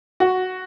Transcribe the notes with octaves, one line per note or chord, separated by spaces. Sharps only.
F#4